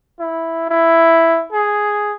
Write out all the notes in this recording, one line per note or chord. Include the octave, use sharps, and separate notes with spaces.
E4
E4
G#4